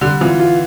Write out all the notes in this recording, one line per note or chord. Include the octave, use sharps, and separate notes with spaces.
D3 G3
E3 F4
F4